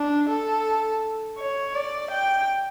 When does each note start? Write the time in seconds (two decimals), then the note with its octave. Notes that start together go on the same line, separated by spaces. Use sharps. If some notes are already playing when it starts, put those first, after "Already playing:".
Already playing: D4
0.29 A4
1.39 C#5
1.74 D5
2.11 G5